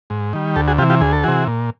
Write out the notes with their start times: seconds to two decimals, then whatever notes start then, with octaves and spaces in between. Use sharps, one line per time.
0.10 G#2
0.33 D#3 G3
0.56 D2 G4 A4
0.68 F#4 G#4
0.78 C3 F4 G4
0.82 E3
0.90 F4 G4
1.01 D2 G#4
1.13 A4
1.23 C3 E3 F#4 G#4
1.47 A#2